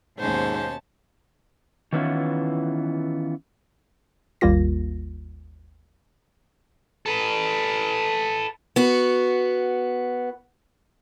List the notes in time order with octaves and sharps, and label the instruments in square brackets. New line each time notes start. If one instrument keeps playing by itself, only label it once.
[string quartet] D#2 B2 [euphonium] G#2 [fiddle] C#4 A5 [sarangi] C5
[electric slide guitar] D#3 E3 B3 C#4 E4 F4
[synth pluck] G#1 D#2 G3 A#3 F4 A#6
[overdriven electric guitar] A4 B4
[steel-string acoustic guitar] B3 F#4